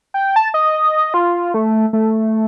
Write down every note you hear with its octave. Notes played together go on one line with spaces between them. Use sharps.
G5
A5
D#5
F4
A3
A3